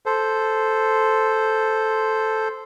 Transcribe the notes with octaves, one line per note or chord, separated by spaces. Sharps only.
A4 C5